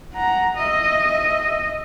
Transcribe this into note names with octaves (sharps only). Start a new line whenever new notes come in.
F#5 A#5
D#5 E5